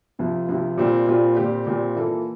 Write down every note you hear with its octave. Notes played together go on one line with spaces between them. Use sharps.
C2 C3 F3
C2 C3 F3
A#2 G3 C4 F4
A#2 G3 C4 F4
A#2 G3 C4 G4
A#2 G3 C4 G4
E3 A#3 F4 A4